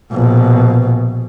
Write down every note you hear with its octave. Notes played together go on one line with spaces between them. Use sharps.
A#1 B2